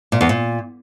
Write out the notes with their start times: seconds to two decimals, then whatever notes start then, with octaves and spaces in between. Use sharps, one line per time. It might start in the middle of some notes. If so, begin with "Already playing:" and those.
0.12 A#2
0.21 E2
0.29 A#2